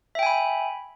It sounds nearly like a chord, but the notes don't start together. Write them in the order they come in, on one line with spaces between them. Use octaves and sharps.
E5 G5 G#5 B5